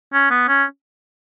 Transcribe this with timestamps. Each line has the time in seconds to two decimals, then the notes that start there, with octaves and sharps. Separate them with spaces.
0.13 C#4
0.31 B3
0.48 C#4